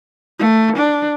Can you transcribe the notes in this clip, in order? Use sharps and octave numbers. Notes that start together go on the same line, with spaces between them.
A3
D4